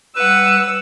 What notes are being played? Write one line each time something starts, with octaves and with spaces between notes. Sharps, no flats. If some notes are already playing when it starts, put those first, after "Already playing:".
G3 B4 F#5 E6